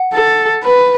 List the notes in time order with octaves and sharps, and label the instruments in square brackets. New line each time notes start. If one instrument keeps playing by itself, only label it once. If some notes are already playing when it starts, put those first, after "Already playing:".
Already playing: [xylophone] F#5
[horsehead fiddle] A4
B4